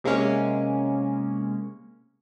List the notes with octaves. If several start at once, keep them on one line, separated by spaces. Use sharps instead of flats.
C3 G#3 A#3 C#4